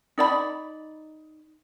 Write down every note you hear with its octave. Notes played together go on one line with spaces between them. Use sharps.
D#4 D5 F5 B5